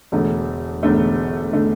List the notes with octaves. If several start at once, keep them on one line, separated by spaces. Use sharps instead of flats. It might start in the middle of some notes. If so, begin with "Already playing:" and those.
E1 E2 D3 A3
E1 E2 D3 A3
D3 A3